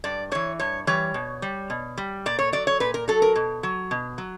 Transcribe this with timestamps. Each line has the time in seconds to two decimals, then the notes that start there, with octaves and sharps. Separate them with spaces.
0.04 G2 D5
0.32 E3 G3 C#5
0.59 G2 C#5
0.87 E3 G3 C#5
1.14 B2
1.42 G3
1.70 B2
1.97 G3
2.26 A#2 D5
2.39 C#5
2.52 F#3 D5
2.67 C#5
2.80 A#2 B4
2.94 A#4
3.08 F#3 A4
3.22 A#4
3.36 B2
3.63 F#3
3.91 B2
4.18 F#3